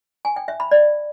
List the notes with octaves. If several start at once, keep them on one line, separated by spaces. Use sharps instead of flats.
G#5
G5
E5
B5
D5